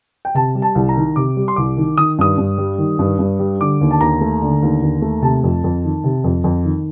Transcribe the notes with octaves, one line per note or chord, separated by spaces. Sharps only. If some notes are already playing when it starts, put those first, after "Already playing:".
G5
C3 A5
G3
A5
C2
A#5
D#3
C3 D6
G3
C6
C2 D6
D#3
D#3 D#6
G2 D#6
G2
G3
D#3
G2
G2
G3
D3 D6
D#2
A5
D#2 A#5
A3
D3
D#2
D#2
A3
C3 A5
F2
F2
D#3
C3
F2
F2
D#3